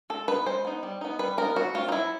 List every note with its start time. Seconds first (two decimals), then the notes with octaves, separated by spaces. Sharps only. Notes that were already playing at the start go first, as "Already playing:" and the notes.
0.10 G#3 A4
0.28 B3 D#4 B4
0.46 G#3 C5
0.65 B3 D#4
0.83 G3
1.01 B3 D#4
1.19 G3 B4
1.38 B3 D#4 A#4
1.56 F#3 F#4
1.74 A3 C4 F4
1.88 D#4
1.92 F#3 E4